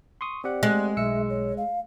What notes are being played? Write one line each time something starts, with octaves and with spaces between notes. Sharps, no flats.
C6 C#6 D#6
C4 G4 D5 F#5
G#3
B1 E5 E6 C#7
C#5
F5